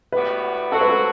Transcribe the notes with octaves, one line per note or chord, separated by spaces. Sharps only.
A2 G3 B3 F#4 B4
F#3 C4 F#4 A4
B4
A4